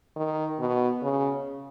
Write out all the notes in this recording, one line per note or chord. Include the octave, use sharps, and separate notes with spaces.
D#3
B2
C#3